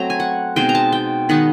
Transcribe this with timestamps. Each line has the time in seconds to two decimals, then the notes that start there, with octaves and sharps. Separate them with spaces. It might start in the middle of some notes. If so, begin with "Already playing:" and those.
Already playing: F#3 A3 C4 A#5
0.10 G#5
0.20 F#5
0.56 B2 G#3 C4 D#4 G5
0.69 A#5
0.75 A5
0.92 G5
1.29 D#3 G#3 B3 D#4 F#5